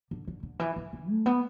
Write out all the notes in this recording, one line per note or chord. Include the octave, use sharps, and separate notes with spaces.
D3
D3
D3
E3
E3
D3
A3
B3